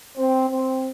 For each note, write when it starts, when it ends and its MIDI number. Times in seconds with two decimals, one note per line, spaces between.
0.16 0.46 60
0.49 0.87 60